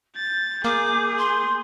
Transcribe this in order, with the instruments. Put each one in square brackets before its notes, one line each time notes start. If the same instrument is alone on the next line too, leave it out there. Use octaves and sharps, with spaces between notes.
[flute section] G6 [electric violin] A6
[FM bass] A#3 [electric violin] G#4 [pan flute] D6
[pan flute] C6